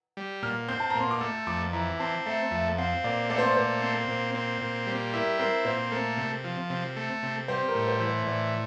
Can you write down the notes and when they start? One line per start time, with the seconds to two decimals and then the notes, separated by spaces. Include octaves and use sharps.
0.17 G3
0.42 A#2 F6
0.68 C4 G6
0.80 A5
0.90 A#2 A#5
1.00 C6
1.11 D6
1.20 A3 E6
1.47 F2 D6
1.73 E3 A#5
1.99 C4 A5
2.26 A3 E5
2.51 F2 E5
2.78 C4 F5
3.04 A#2 D5
3.30 A3 D5
3.38 C5
3.48 D5
3.56 A#2 C5
3.82 C4
4.08 A#2
4.35 C4
4.61 A#2
4.86 G3
5.13 E4 A#4
5.39 C4 A#4
5.65 A#2 C5
5.92 A3 A#4
6.17 C3
6.44 F3
6.70 C3
6.96 A3
7.23 C3
7.48 G3 C5
7.68 A#4
7.75 A2
7.88 C5
8.00 E3
8.07 C5
8.27 A2 D5